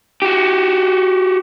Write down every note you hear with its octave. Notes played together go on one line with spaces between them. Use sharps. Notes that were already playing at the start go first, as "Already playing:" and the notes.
F#4 G4